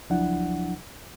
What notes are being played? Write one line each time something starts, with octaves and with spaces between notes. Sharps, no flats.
C#2 F3 F#3 D4 E4 F#5